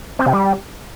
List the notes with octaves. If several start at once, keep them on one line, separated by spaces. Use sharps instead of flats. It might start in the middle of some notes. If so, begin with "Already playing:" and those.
C4
C3
G3